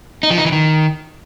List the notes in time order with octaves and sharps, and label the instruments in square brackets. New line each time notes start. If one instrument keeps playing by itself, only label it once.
[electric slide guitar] D#4
F3
D#4
E3
D#3